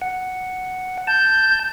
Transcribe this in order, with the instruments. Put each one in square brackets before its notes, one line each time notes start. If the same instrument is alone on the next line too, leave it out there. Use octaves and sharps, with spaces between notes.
[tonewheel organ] F#5
[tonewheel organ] A5 [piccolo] G6